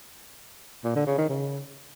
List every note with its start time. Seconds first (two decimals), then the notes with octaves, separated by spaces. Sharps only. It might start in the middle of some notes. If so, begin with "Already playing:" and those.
0.84 A#2
0.95 D3
1.07 C#3
1.18 D#3
1.29 C#3